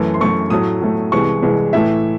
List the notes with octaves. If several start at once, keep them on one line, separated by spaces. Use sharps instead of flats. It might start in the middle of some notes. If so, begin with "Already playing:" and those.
Already playing: F#2 E3 A3
C6
F#2 E3 A3 C#6
A2 F#3 A3 D#6
A2 F#3 A3
C2 C3 E3 G#3 C#6
C2 C3 E3 G#3
A2 E3 A3 E5